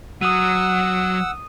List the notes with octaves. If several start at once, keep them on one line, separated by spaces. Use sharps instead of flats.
F#3 F#5 D#6 E6 D#7